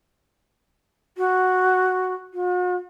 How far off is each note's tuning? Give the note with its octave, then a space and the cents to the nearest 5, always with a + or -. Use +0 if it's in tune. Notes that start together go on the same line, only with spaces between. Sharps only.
F#4 +0
F#4 -45